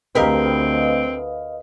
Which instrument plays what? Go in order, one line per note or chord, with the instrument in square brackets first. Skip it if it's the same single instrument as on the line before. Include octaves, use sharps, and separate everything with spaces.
[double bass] D2 [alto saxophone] C4 [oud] G4 A#4 [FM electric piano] B4 D#5 F5